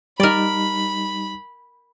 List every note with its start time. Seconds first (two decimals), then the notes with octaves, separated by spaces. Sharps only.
0.20 G3 D#4 A#4 D5 B5